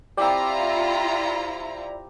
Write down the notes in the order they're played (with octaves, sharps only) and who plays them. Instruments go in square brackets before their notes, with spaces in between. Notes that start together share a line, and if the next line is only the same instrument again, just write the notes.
[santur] C4 G4 [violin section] E4 F4 A#5 [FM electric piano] D5 E5